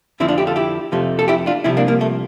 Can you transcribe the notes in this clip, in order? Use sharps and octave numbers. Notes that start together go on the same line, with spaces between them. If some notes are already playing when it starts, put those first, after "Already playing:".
F2 D3 F3 C4 E4
D4 F4
E4 G4
F4 A4
E4 G4
F2 C3 F3 A3
A4
E4 G4
D4 F4
C2 C3 F3 C4 E4
A#3 D4
A#3
A3